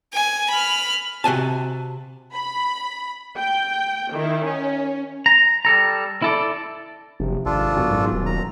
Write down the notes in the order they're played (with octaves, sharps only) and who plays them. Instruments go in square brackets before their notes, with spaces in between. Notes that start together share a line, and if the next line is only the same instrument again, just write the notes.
[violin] G#5
B5 F6
[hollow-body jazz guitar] C3 F#4 G#5 A5
[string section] B5
G5
D#3 E4
C#4
[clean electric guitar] A#5
G3 A4 A#5
E4 A4 D5
[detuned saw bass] F#1 [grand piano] C3 F3
[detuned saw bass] G#1 [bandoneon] D4 F4 A4
[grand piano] F#2 B2 C#6
[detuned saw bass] G#2
D#1
[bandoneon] A#5